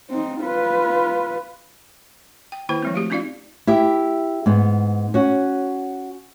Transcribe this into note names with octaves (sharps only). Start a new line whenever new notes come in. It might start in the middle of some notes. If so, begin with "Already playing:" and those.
C4 D#4
F4 B4
G5
D#3 A#3 E4 C5 G5
F3 G#3 C4
A3 F#4 G4
C4 C#4 D#4 F4 D5 F5
E4 G4 E5
G#2 B3
C#4 F#4